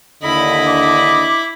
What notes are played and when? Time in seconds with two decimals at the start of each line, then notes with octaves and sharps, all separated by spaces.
0.23 D#2 D3 D4 E4 D#5 B5
0.66 D6